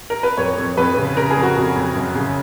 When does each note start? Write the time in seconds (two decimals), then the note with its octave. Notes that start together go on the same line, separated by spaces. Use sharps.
0.10 A#4
0.23 B4
0.37 F2 C#5
0.58 F2
0.77 F2 B4
0.97 C#3
1.17 C#3 A#4
1.31 G#4
1.37 F2
1.43 F#4
1.57 F2
1.76 F2
1.95 F#2
2.15 C#3